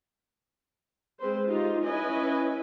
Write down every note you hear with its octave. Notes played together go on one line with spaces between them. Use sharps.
G#3 C4 B4 C5
D#4 F4 G4
C#4 E4 B4 D#5 G#5